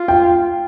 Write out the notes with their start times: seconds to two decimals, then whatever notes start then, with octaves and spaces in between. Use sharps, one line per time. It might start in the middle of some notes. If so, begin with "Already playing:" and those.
Already playing: F4
0.08 G5